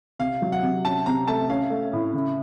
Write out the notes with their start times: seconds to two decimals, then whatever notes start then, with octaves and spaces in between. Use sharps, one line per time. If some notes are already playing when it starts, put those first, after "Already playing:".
0.19 C3 F5
0.42 F#3
0.52 F#5
0.63 C3
0.85 C#4 A5
1.06 C3 A#5
1.28 A3 A5
1.49 C#4 F5
1.70 A3
1.93 A2
2.13 C#3